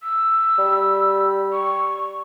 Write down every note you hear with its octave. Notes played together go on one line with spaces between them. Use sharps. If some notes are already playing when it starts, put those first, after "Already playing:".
E6
G3
C#6